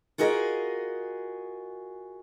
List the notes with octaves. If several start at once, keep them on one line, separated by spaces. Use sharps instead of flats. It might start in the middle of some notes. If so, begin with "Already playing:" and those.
F4 F#4 G#4 A#4 D#5